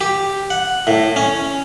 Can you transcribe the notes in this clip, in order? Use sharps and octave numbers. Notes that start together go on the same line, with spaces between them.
G4
F#5
A2
C#4